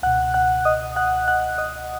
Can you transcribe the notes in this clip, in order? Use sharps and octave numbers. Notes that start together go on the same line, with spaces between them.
C#2 B2 F#5 F#6
F#5 F#6
D#5 D#6
F#5 F#6
F#5 F#6
D#5 D#6